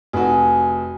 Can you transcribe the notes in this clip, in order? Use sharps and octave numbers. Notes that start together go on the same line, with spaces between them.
F1 F#4 G#4